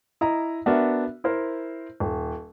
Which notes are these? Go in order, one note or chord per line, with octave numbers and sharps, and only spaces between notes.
E4 D#5 A#5
B3 D4 F#4 A#4 E5
E4 A#4 C5
D#1